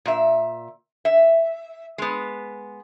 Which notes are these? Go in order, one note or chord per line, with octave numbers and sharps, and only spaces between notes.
A#2 E5
E5
G#3 B3